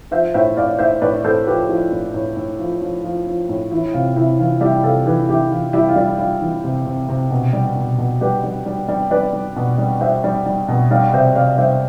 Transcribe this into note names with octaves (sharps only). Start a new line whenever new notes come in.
F3 C5 E5
A2 C5 E5
A2 D5 F5
A2 C5 E5
A2 B4 D5
A2 A4 C5
F3 G4 B4
F3 E4 G4
A2
A2
A2
F3
F3
F3
F3
A2
E3 E4
C3 F4
C3 E4
E3 F4
G3 E4 G4
C3 F4 A4
E3 G4 B4
E3 E4 G4
E3 F4
G3 E4 G4
F4
G3 E4
G3 F4
E3
C3
C3
C3
B2
G3
B2
B2
G3 G4 B4
G3
G3
G3
G3 B4 D5
G3
B2
G3
G3 C5 E5
G3
G3
B2
G3 D5 F5
C3 C5 E5
C3 D5 F5
G3 C5 E5